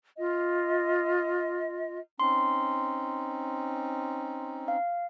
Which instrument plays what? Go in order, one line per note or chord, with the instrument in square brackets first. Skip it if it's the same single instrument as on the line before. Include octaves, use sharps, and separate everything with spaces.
[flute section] F4 D#5
[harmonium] C4 C#4 D#4 [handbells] C6
[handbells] F5